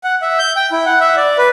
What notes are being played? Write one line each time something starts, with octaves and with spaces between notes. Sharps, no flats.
F#5
E5
G6
G5
E4
F#5
E5
D5
B4